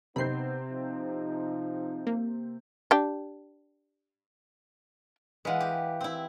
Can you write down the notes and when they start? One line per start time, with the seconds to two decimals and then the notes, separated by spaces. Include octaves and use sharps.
0.16 C3 B3 C4 D#4 B5 G6 C7
0.70 F3 D#4
2.07 A#3
2.91 D4 G4
5.45 E3 G#3 B4 F5 F#5
5.60 G4
6.01 C4 E4